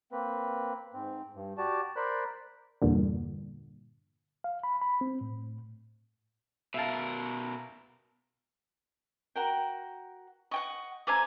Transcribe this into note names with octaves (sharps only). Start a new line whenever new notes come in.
A#3 C4 B4
G#2 C4
G2
F#4 G4 D5 A5
A#4 C5 D5 B5 F#6
E2 G2 A#2 D3
F5
B5
B5
C4
A2
B2 A#4 E5 F5 A5
F#4 A#4 G5
D#5 F#5 G5 C#6
A3 C5 D5 G#5 A#5 D6